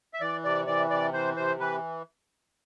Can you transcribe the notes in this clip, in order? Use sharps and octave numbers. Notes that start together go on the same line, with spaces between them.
E5
E3 D5
C3 D5
E3 D5
C3 D5
E3 C5
C3 C5
E3 B4